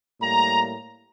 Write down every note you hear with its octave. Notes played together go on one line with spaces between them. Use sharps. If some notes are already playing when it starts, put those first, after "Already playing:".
A2 G3 A#3 A#5